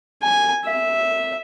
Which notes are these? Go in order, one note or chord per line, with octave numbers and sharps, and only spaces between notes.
G#5
E5